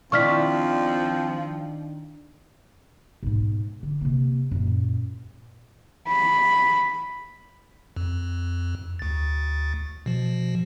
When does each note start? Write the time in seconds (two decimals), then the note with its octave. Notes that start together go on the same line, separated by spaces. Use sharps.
0.12 D#3 F3 C4 D4 E4 C#6 F6 B6
3.23 B1 G#2
3.83 D3
4.01 C3 A#3
4.51 F#2 A#2
6.08 B5
7.97 F2
8.99 D2 A6
10.06 B2 F3